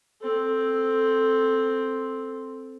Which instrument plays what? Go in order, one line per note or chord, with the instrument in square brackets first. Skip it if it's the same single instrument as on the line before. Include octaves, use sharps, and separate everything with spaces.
[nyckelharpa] C4 A4